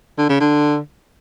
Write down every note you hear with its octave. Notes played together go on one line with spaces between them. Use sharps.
D3
C#3
D3